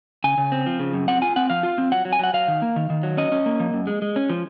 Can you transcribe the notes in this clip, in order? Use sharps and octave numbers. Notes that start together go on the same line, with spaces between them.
C#3 G#5
C#3
C4
F3
C#3
F#2
C4 F#5
F4 G#5
C4 F#5
F3 F5
F4
C4
F#3 F#5
F#3
G#5
F#3 F#5
F#3 F5
D#3
A#3
D#3
D#3
F#3
C#4 D#5
C#4
A#3
F3
F#2
G#3
G#3
C#4
F3